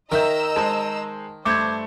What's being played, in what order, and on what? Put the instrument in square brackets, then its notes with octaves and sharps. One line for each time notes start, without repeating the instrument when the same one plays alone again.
[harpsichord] D#3 [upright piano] A#4 E5 G6 [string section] D#5 A#5 E6
[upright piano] G#3 C5 [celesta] A5
[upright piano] G2 A3 [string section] C5 [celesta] D6 G6 G#6